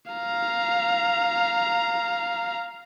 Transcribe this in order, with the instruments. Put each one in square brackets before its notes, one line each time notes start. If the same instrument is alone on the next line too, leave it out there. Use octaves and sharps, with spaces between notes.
[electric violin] F5 A#5